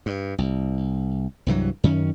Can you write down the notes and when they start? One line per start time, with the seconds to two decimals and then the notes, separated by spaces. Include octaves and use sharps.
0.06 G2
0.38 C2
1.46 C2 G2 E3 F#3
1.84 F#2 D#3 C#4